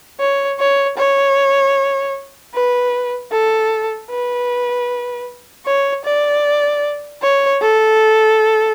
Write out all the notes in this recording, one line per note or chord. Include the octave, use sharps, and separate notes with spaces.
C#5
C#5
C#5
B4
A4
B4
C#5
D5
C#5
A4